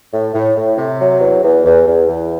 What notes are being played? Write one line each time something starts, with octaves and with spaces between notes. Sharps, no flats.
A2
A2
A2
C3
F#3
E2
E2
E2
E2
E2